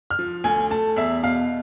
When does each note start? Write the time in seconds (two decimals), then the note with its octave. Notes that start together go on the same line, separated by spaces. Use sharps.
0.10 F6
0.19 F3
0.44 D2 G#5
0.71 A3 A5
0.96 E2 E5
1.23 B2 F5